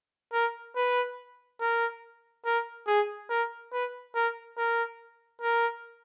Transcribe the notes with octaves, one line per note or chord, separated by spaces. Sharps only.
A#4
B4
A#4
A#4
G#4
A#4
B4
A#4
A#4
A#4